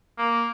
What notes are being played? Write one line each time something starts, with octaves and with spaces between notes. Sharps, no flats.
A#3